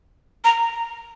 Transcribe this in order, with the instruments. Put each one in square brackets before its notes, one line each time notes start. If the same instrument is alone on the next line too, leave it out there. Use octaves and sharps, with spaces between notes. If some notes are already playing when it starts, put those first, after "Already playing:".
[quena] A#5